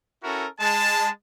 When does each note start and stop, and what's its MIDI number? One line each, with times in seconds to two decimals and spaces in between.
0.23 0.46 61
0.23 0.46 64
0.23 0.46 66
0.23 0.46 69
0.23 0.46 70
0.60 1.08 56
0.60 1.08 81